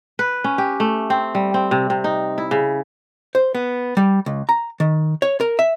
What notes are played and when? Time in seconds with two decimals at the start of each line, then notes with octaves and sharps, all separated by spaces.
0.19 B4
0.44 C#4
0.58 G4
0.80 A3
1.10 C4
1.35 G3
1.54 C4
1.71 C3
1.90 C3
2.04 D#4
2.38 E4
2.51 C#3
3.35 C5
3.55 B3
3.97 G3
4.26 C#2
4.49 A#5
4.80 D#3
5.22 C#5
5.41 A#4
5.59 E5